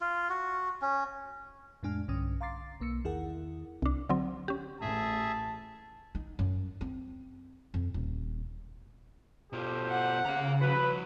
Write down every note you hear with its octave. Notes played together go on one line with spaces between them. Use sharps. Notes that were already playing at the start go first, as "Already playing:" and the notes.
F4
F#4
C#4
F2 A2 G#3 D4 G#5 F6
B1 G2 D3 C#4 D#6
F5 A#5 C6 D6 A6 C7
B1 A#3 E6 C#7
E2 D#3 E4 G#4 A#4 F#5
C2 D4
D3 F#3 C4
C#4 G4
A1 G#4 E5 A5
D#4
F#2
C4
F2
D#1
B2 F4 G4 A4 C5
F#5
C#3 F5 A#5
F3 F#4 B4